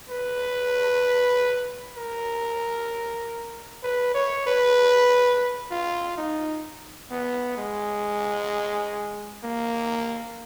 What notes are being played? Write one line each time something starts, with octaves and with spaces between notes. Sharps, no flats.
B4
A#4
B4
C#5
B4
F4
D#4
B3
G#3
A#3